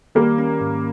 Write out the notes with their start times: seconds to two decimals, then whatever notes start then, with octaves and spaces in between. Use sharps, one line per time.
0.15 D#3 G3 A#3
0.38 C#4
0.61 G#2